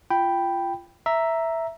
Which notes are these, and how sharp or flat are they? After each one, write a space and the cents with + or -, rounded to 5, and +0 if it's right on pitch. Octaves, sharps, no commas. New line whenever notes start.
F4 -20 G5 +0 B5 +0
E5 +0 A#5 +0